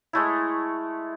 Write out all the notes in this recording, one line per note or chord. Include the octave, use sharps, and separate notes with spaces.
G#3 A3 E4